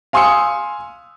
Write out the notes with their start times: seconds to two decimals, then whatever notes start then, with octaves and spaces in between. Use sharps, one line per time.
0.13 F5 G#5 C6 D#6 E6 C#7